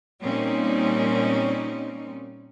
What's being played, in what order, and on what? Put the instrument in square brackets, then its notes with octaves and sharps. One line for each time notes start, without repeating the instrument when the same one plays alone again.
[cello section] A#2 G3 C4 C#4 D#4